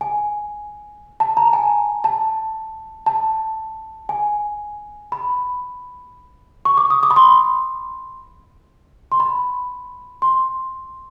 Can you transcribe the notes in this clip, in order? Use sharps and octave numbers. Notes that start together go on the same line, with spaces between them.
G#5
A5
A#5
G#5
A5
A5
G#5
B5
C#6
D6
D#6
D6
B5
C6
C6
B5
C6